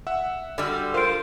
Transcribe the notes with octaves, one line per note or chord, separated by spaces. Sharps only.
E5 F#5 E6
D3 G3 F#4 D5
F4 A#4 C5 F5 D7